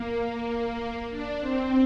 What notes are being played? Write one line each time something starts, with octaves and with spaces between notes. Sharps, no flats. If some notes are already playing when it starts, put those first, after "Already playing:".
Already playing: A#3
D4
C4